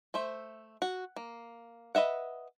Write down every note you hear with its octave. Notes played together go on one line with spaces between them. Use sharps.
A3 C5 E5
F#4
A#3
B4 D#5 E5 F#5